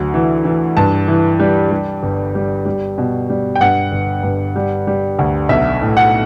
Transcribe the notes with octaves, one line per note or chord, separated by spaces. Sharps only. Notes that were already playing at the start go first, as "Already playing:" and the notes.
Already playing: D2 F#3
E3
E3
G2 A5
E3
G3
G3
G1
G3
G3
B2
G3
G5
G2 F#5
G1
G2
G3
G3
D2
B1 E5
A2
F#5